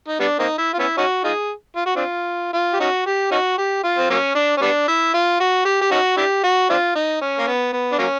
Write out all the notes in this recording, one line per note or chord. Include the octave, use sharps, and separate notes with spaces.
D#4
G3 B3 D4
A#3 C4 D#4
E4
F4
B3 C#4 E4
C#4 D#4 F#4
D#4 F4 G#4
F4
F#4
C4 D4 F4
F4
G4
C#4 D#4 F#4
G4
C#4 D#4 F#4
G4
F4
C4
F#3 A#3 C#4
D4
C#4
G3 B3 D4
E4
F4
F#4
G4
G4
C#4 D#4 F#4
D4 E4 G4
F#4
C4 D4 F4
D#4
C#4
A#3
B3
B3
D4
F#3 A#3 C#4